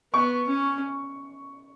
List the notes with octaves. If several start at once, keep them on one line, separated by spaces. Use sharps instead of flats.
B3 C#6
C#4